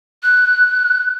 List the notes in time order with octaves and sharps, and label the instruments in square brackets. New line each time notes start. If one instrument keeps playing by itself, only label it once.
[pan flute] F#6